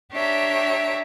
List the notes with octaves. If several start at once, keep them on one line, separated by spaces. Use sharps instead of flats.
D4 G4 C#5 E5 A#5